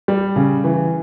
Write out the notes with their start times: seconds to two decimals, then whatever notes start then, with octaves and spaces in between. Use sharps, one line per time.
0.08 G3
0.36 C#3
0.64 E3